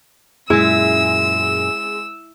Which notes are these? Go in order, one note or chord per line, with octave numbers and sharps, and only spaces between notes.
F#2 A#2 G#3 E4 E6